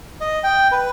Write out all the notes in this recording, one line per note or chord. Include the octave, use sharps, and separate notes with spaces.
D#5
G5
B4